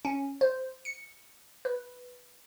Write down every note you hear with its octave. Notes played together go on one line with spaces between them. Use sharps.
C#4
C5
C#7
B4